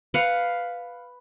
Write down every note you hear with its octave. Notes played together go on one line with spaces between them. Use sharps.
B4 F5 F#5